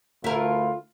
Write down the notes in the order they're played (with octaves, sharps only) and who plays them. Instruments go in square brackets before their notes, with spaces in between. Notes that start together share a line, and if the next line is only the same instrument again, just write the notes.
[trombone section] D2 A3 F4 [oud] E4 A#4